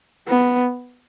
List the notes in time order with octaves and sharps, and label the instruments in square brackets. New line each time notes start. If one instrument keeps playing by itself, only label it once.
[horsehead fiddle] B3